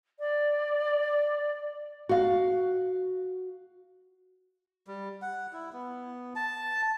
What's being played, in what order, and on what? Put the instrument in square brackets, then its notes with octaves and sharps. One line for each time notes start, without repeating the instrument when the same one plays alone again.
[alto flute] D5
[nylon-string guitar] F#4 F5
[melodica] G3
F#5
E4
B3
A5